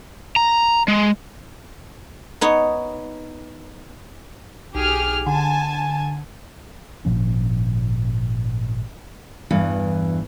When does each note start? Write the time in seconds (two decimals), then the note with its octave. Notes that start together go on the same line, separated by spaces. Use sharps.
0.36 A#5
0.88 G#3
2.41 B3 D#4 C#5
4.75 B1 G4 G#4 F6
5.26 D3 G#5 A5
7.05 G#1 A#2 F3 C#4
9.51 E2 G2 E3